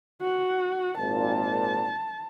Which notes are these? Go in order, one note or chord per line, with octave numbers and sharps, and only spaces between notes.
F#4
G#1 A#2 A5